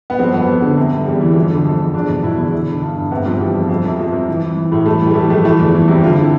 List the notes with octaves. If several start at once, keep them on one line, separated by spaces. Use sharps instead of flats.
B3
F2 C4
F2 B3
F2
D3
C3
C3
E2 G3
E2 E3
F2 F3
D3
F2
F2
E2 D4
B2
B2 E4
E2 E4
D3 E4
D3
G2
G2
C3 B3
C3 F3
E3 G3
F2
F2
C3
F2 F3
C3
E3
E3
E3
A2
E3 A3
E3 G3
A3
E3 G3
F2 A3
E3 A3
E2 E3
E3
C3 G3
D3 F4
D3 E4